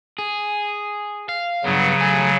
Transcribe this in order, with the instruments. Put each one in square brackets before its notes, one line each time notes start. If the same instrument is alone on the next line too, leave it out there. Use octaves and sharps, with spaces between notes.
[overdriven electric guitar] G#4
F5
[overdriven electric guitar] G2 B3 [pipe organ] C#3 F#3
[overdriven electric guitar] A3 G#5